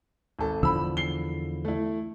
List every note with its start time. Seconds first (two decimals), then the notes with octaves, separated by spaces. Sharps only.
0.39 G#1 A4
0.63 E2 D3 F3 B5 E6
0.97 C7 G7
1.65 A3 E4